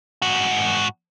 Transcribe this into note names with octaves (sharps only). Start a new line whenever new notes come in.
G#2 F#4